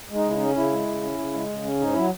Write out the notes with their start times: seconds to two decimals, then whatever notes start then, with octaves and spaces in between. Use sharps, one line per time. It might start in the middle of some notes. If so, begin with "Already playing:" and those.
0.09 G#3
0.15 D#4
0.25 C#3
0.30 E4
0.35 D#4
0.40 C#4
0.56 C#3 E4
0.71 G#3
0.87 C#3
1.03 C#4
1.18 C#3
1.33 G#3
1.49 C#3
1.64 C#4
1.80 G#2 D#4
1.93 F#3 E4